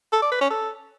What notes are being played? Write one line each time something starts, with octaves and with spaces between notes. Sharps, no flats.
A4
D5
B4
C#4
A4